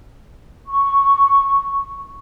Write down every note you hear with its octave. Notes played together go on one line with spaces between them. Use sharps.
C#6